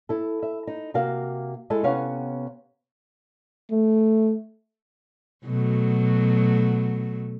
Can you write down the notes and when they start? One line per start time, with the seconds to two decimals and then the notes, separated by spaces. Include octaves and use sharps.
0.09 E4 A4
0.43 E5
0.67 D#4
0.94 C3 A#3 F#4 F5
1.70 G#3 E4 A4
1.83 C3 B3 C#4 C#5 F5 F#5
3.71 A3
5.45 B2 F#3 A3